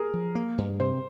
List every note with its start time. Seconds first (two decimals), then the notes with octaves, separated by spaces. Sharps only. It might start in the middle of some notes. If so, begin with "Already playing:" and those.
Already playing: G#4 A#4
0.14 F3
0.35 A#3
0.58 G2
0.80 C3 C5